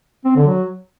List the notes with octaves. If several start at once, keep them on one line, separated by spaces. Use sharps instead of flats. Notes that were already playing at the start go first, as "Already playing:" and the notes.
C4
D3
F#3